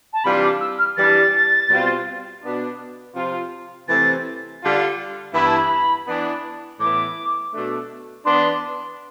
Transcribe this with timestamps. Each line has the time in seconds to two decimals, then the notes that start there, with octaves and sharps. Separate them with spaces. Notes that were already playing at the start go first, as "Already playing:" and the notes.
0.13 A5
0.24 C3 E3 G3 D4 F4 B5
0.43 D6
0.60 E6
0.78 F6
0.96 E3 G3 D4 A6
1.69 B2 G3 C4 F4
2.43 B2 B3 D4
3.15 C3 F3 C4 F4
3.88 C3 E3 A3 C4 A6
4.61 D3 G3 D4 F4
5.33 G2 E3 B3 E4 B5
5.46 A5
5.56 B5
6.07 E3 B3 D4
6.79 A2 E3 B3 E4 D6
7.53 B2 A3 D4
8.25 E3 B3 D4 C6